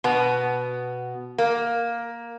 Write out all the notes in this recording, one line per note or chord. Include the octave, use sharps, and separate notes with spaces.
B2 B3
A#3